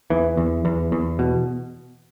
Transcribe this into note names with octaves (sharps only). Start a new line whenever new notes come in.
E2 E3
E2
E2
E2
B2